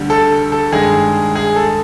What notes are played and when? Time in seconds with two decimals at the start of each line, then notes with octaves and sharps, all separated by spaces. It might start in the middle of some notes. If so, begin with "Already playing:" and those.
Already playing: D2 D3 G3
0.10 A4
0.52 A4
0.72 G2 D#3 G#3 G#4
1.35 G#4
1.56 A4